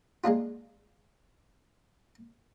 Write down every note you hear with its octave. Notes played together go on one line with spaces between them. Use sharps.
G#3 A#3 D4 F4